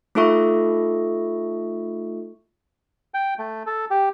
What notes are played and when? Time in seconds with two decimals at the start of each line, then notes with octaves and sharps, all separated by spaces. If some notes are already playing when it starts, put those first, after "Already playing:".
0.15 A3 D#4 F4 A4 E5 C#6
3.14 G5
3.38 A3
3.66 A4
3.90 G4